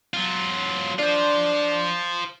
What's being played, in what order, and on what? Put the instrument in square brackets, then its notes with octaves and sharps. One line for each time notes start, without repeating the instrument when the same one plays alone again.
[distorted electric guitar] F#3 F4
[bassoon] D4 [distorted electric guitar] F4 C5